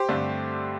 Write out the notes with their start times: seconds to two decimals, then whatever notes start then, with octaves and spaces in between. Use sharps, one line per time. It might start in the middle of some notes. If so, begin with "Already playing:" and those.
Already playing: G4 C5
0.09 G2 D3 A3 C4